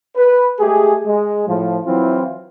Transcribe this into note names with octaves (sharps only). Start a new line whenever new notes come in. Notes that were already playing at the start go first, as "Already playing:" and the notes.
B4
G#3 A3 G4 G#4
G#3
A2 F3
E3 F#3 C4 E4 F4